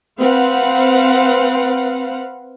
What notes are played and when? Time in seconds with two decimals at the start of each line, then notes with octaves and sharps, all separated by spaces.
0.18 C4 B4 F5 F#5